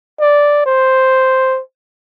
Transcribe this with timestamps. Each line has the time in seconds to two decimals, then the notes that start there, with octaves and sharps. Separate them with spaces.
0.20 D5
0.66 C5